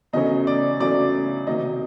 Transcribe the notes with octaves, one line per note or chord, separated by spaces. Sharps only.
E2 C#3 F#3 A3 C#4 D#5
D5
E2 C#3 F#3 A3 C#4 D5
C3 D#3 F#3 A#3 D#4 D#5